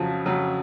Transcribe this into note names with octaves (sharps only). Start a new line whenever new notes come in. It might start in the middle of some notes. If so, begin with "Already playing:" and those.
Already playing: F2 C#3 F3 F#3
F2 C#3 F#3